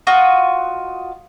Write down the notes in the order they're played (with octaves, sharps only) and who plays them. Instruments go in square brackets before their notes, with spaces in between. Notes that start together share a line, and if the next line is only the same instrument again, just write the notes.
[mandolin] F4 F#4 D#5